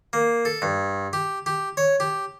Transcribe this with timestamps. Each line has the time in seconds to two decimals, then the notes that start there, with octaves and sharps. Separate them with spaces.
0.13 A#3
0.45 A4
0.62 G2
1.13 G4
1.46 G4
1.77 C#5
2.00 G4